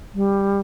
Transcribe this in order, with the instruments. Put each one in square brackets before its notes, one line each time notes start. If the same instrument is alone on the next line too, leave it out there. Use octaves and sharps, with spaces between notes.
[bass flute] G3